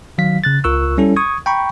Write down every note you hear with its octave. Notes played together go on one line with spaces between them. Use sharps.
D#3 F#3 F5 B6
C#3 F#6 A6
C#2 F4 A#4 C#6 E6 F#6
G3 C#4 E4 A4
C#6 D#6 G#6
G5 A#5 B5 C#6